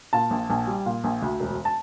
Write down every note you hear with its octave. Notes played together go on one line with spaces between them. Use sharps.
A#2 A5
A#1
A#1
G3
A#2
A#1
D2
E1
A5